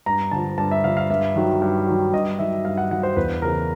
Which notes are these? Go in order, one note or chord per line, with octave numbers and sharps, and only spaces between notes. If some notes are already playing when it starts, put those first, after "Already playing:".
G2 A#5
D3 F3 A5
G2 A5
E5
D3 F3 F5
F5
G2 E5
D#3 F#3
G2
D#3 F#3
G2 D#5
D#3 F#3 E5
G2 F5
F#5
D#3 F#3 F#5
C5
E2 B4
C#3 E3 A#4